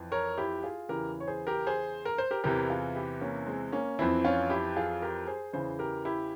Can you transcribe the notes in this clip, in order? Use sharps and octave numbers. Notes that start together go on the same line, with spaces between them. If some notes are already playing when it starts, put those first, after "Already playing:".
Already playing: F2 E3
A#4 C#5
E4 G4
F4 G#4
E2 C#3 E3 G4 A#4
C#5
G#4 C5
G4 A#4
G#4 C5
A#4
C5
G4 A#4
E2 C3 E3 G4 A#4
F4 G#4
E4 G4
A#3 C#4
G#3 C4
A#3 C#4
F2 E3 C4 E4
C#4 F4
E4 G4
F4 G#4
G4 A#4
G#4 C5
E2 C#3 E3 G#4 C5
G4 A#4
E4 G4